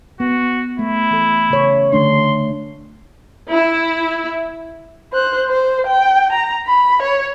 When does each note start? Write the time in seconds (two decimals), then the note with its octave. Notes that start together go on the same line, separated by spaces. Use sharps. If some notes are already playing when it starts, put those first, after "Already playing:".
0.20 B3 F#4
0.79 A3 E4
1.11 E3 A4
1.50 C#3 C#5
1.92 D3 A3 D4 C6
3.52 E4
5.13 C5 F#6
5.49 C5
5.86 G5
6.32 A#5
6.66 B5
7.02 C#5